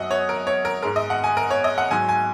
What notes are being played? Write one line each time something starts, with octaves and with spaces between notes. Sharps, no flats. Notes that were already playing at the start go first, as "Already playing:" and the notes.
Already playing: F#2 F#3 D#5 F#5
C#5
A#4
C#5
A#4
G#2 G#3 A#4
D#5
F#5
G#5
A#4
C#5
D#5
F#5
G#2 F#3 G#5
G#5